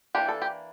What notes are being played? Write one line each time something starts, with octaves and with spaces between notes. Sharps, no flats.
E3 A#3 D4 G4
A4
G4